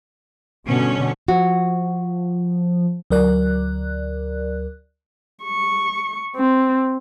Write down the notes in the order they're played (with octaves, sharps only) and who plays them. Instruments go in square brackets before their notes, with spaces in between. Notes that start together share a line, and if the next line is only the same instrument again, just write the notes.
[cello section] G2 C#4 [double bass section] B2 D3
[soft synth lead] F3 [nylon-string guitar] F#4
[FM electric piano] D2 F#3 A#4 D5 F#6
[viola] C#6
C4